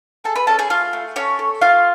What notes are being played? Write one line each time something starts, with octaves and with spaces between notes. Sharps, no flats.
G#4 A4 A5
B4 B5
C#4 A4 A5
G#4 G#5
A3 F4 F5
A3
C#4 A4 C#5
A4
A3 F4 F5